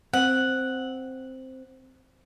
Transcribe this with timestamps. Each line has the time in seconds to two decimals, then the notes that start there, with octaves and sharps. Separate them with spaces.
0.13 C4 F#5